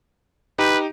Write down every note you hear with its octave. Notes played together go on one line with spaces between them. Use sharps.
D#4 G4 B4